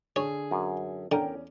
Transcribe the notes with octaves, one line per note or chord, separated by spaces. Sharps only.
D3 G#4 C#5
F#2
E2 D3 C#4 A#4 G5